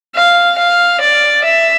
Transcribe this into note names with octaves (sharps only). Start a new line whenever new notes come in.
F5
F5
D5
E5